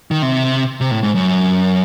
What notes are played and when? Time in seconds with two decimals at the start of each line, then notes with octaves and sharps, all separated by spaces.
0.11 D#3
0.22 C3
0.81 C3
0.91 A2
1.03 G#2
1.15 F#2